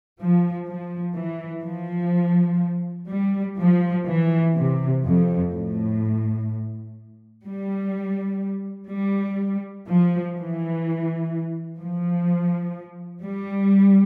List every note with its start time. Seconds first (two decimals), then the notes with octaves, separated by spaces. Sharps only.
0.20 F3
0.68 F3
1.17 E3
1.65 F3
3.10 G3
3.59 F3
4.07 E3
4.55 C3
5.04 F2
5.52 A2
7.45 G3
8.90 G3
9.87 F3
10.36 E3
11.81 F3
13.26 G3